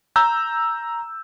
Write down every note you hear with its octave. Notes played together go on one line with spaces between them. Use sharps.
A#5 E6 G6